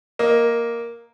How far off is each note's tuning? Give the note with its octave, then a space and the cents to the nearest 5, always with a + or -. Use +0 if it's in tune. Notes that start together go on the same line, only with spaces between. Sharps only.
A#3 +5 D#5 +10